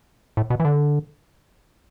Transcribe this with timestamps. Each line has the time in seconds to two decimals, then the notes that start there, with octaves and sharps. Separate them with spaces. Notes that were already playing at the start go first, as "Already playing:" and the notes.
0.37 A2
0.50 B2
0.60 E3
0.65 D3